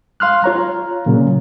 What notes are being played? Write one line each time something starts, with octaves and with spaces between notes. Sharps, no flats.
F5 C6 F6 F#6
F4 C#5 A#5
A#2 C#3 F#3